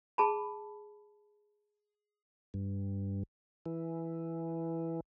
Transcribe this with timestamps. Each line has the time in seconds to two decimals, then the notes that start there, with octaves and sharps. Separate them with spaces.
0.18 G#4 A5 B5
2.54 G2
3.66 E3